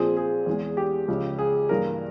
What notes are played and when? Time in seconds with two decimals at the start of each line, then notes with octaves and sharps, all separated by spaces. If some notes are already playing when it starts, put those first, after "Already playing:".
Already playing: A#2 F3 C4 G#4
0.17 G#4
0.46 E2 E3 G#3
0.77 G4
1.08 C#2 C#3 F3
1.39 G#4
1.69 G2 E3 A#3 A#4